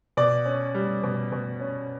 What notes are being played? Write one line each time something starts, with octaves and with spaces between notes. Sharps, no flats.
B2 D5
C#4
G3
B2
B2
C#4